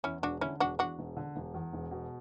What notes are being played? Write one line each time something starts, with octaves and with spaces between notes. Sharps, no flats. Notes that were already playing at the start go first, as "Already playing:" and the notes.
E2 C#4 E4
E1 D4 F#4
D3 C#4 E4
E1 D4 F#4
E2 D4 F#4
E1
D3
E1
E2
E1
B2